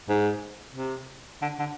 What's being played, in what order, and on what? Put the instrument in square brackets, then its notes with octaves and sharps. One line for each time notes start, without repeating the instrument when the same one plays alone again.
[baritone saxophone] G#2
C3
D3
D3